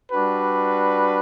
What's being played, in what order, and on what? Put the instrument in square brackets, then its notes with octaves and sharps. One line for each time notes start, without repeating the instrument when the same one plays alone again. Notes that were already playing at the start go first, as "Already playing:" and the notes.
[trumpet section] G3 D4 F#4 B4